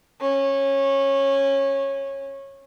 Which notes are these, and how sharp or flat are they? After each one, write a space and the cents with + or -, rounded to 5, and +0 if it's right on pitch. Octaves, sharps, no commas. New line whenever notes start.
C#4 -15